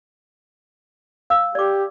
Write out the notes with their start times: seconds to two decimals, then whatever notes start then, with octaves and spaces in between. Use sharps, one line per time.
1.30 F5 E6
1.55 G4 D5 D6